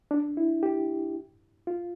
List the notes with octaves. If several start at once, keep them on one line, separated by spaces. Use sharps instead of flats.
D4
E4
G4
F4